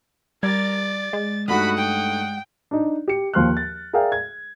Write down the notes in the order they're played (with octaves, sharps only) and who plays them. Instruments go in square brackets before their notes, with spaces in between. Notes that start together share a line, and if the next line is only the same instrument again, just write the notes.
[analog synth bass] G3 [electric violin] A#4 A6 [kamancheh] D5 [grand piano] G#6
[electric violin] A6
[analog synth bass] G#3
[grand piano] G2 A3 D#4 [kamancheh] F#4 B5 [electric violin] F#5 D#6
[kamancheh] G5
[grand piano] D4 D#4
G4 C#7
D#2 F3 C6 F6 F#6
A6
G#4 A#4 D5 E5 F5 G5
G#6